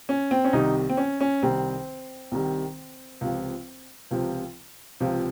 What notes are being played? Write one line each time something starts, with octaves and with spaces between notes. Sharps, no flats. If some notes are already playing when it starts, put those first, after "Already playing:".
C#4
C4
C#4
C2 C3 D#3 G3 D#4
C4
C#4
C#4
C2 C3 D#3 G3 C4
C2 C3 D#3 G3
C#2 C3 F3
C#2 C3 F3
C#2 C3 F3